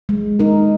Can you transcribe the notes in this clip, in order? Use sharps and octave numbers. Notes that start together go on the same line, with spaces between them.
G#3
D#4 A#4